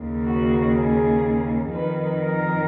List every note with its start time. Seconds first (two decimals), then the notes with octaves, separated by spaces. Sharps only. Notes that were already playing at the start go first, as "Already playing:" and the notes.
Already playing: D#2 C#3
0.25 F#4
0.74 G#4
1.72 F2 D#3 B4
2.21 A#4